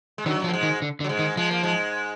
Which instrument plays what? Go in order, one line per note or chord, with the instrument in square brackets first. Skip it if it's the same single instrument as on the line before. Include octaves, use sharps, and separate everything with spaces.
[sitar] G#3
[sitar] F#2 F#3 [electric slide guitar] D#3
[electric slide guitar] F3
[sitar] A#3
G#2 G#3
[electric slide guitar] D#3
D3
D3
[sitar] F#3
G#2 G#3
[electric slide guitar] D#3
[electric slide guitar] F3 [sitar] G#3
[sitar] A#3
G#2 G#3